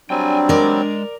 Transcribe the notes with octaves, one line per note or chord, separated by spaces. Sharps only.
F#3 G3 C4 D4 G5 G#5
G#3 A#4 D5